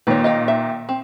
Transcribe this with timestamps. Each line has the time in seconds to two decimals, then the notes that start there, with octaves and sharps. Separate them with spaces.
0.07 A#2 D#3 B4 C#5
0.24 D#5 F5 G5
0.48 E5
0.89 C4